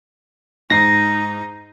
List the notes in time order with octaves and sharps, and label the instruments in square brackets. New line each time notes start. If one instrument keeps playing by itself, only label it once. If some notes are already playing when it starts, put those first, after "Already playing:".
[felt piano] G#2 C7 [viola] D#4 [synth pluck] A#6